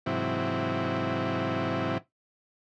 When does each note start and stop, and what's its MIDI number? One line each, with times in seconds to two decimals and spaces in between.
0.06 1.98 44
0.06 1.98 48
0.06 1.98 52
0.06 1.98 54
0.06 1.98 60
0.06 1.98 64